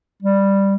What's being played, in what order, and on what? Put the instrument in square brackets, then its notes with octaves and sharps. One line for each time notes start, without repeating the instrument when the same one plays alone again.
[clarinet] G3